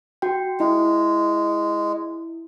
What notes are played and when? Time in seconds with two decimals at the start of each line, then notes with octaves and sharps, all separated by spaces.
0.22 F#4 G5
0.60 G#3 E4